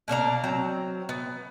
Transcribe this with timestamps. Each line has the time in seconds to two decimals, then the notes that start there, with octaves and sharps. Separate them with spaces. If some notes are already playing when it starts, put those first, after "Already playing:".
0.08 B2 A#3 D4 A#5
0.44 F#3 C4 A#5
1.09 B3